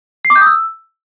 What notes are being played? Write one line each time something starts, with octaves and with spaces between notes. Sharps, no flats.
C7
D6
G6
D#6
E6